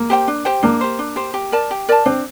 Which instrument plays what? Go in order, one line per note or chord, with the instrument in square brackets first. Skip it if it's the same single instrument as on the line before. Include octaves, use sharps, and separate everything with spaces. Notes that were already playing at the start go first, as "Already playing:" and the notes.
Already playing: [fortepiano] A#3
[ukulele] G4 C5 G5
D4
G4 C5 G5
[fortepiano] A#3 [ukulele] D4
[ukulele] G4 C5
D4
G4 C5
G4
A#4 D5 A5
G4
A#4 D5 A5
[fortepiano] C4 [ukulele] D4